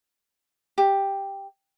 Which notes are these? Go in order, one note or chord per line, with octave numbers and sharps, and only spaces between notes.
G4